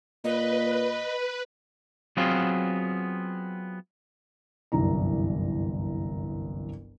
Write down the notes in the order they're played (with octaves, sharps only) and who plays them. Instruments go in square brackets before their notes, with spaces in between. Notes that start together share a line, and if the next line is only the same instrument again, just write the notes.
[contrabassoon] A#2 [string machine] B4 [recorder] D#5
[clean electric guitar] F#3 B3 C4 F4 G#4
[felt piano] G1 C2 F#2 E3 A#5